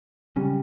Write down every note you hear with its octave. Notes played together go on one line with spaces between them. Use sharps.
C#3 F#3 G3 C#4